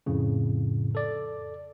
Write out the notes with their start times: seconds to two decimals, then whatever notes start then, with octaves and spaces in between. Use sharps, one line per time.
0.06 F2 A2 C#3
0.95 A4 D5